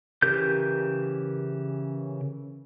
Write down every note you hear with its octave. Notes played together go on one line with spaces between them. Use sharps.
C#3 E3 G4 A#4 G6